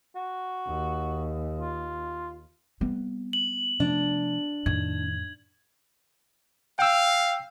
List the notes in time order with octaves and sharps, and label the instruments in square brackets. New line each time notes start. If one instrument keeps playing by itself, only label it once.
[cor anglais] F#4
[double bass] D#2
[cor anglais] F4
[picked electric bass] G3 C4 [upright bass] B3
[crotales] F#7
[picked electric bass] C3 F3 A3 [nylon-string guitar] D4
[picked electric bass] F2 A2 [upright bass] D#3 [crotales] G#6
[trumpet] F5 [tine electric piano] G5 E6